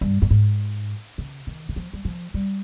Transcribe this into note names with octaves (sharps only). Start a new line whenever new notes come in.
G2
G2
G#2
C#3
D#3
D#3
F3
G3
F3
G3